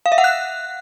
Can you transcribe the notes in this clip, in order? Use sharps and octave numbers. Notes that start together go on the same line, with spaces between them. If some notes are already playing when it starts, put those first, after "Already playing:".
F5
E5
F#5
F#6